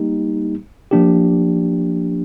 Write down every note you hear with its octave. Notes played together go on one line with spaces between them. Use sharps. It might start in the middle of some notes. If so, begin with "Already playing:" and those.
Already playing: G3 A#3 D#4 G4
F3 A#3 D4 G4